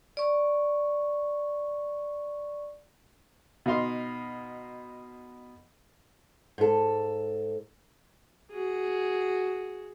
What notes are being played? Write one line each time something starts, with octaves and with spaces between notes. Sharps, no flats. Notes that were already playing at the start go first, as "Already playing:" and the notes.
D5 C#6
B2 D#4 F5 C6
G#2 A4
F#4 G#4